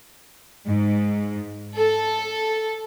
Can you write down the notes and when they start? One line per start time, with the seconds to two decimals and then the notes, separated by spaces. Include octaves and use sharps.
0.68 G#2
1.76 A4